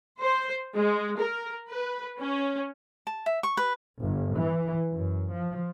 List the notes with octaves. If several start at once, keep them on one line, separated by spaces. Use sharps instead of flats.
C5
G#3
A#4
B4
C#4
A5
E5
C#6
B4
G1
E3
F#2
F3